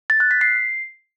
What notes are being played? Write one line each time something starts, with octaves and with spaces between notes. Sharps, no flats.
A6
F#6
B6
C7